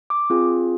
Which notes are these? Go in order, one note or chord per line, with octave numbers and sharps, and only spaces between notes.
D6
C4 F4 G#4